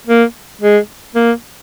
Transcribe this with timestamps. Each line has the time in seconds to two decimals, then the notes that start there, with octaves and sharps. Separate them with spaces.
0.07 A#3
0.62 G#3
1.15 A#3